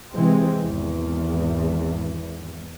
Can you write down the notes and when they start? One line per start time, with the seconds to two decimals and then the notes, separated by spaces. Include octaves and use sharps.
0.13 C3 E3 G#3 C4
0.63 G#1 E2